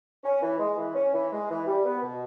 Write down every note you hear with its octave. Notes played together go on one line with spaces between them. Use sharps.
C#4
E3
G#3
E3
C#4
E3
G#3
E3
G3
B3
B2